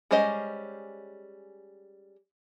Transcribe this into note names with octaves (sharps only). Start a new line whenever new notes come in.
G3 G#3 C#4 C5 D#5